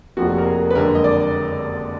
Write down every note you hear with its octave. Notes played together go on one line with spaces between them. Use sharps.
F1 F2 F3 A#3 F#4
A#4
G#4
B4
F#1 F2 D3 G#3 A#4
D#5
D5